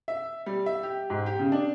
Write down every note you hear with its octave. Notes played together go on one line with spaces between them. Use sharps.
E5
G3
E5
G4
G#2
G4
C#3
D4